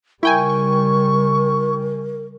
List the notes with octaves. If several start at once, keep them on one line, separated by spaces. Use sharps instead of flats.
C#3 G3 E4 A#4 G5 G#5 C#6